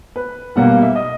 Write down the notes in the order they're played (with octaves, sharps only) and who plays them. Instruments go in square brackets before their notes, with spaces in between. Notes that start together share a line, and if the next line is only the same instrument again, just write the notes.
[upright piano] B4
B1 B2 G3 A#3 F#5
F5
E5
D#5